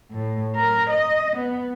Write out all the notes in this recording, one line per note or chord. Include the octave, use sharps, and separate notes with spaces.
A2
A#4
D#5
B3